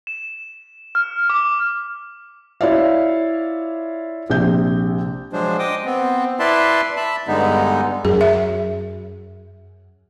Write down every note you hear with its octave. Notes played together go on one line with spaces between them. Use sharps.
E7
F6
D6
E4 F4 C#5 D5 E5 F5
A#1 C3 G6
F3 F#3 G#3 D4 C5
D#5 G5 D6 D#6
B3 C4
E4 B4 D5 E5 A5 C6
E5 A5 B5
G2 D3 G#3 B3 D#4
F#2 G#4
E5